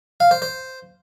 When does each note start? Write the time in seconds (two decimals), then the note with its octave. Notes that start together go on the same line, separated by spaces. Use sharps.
0.20 F5
0.31 C5
0.42 C5